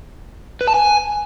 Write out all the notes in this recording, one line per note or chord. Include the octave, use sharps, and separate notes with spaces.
B4
A5
G#5